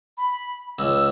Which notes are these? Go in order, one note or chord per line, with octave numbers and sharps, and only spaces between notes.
B5
C#2 E6